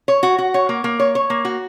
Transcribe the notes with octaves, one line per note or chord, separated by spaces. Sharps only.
C#5
F#4
F#4
C#5
A#3
A#3
C#5
C#5
A#3
F#4